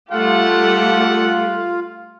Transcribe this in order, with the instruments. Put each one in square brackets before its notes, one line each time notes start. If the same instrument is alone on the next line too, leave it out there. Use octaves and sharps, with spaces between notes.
[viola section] G3 A3 G4 [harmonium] F4 F5 [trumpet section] A4 F#5